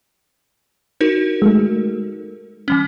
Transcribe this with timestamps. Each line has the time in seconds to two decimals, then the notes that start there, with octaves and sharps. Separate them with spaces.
1.01 D#4 F#4 A#4
1.42 G#3 A3
2.68 E3 G3 C#4